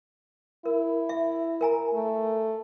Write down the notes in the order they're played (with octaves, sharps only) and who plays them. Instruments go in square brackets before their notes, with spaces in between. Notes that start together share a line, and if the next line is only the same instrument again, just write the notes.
[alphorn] E4 [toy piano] A#4
[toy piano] E5
A#4 G#5 A#5
[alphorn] A3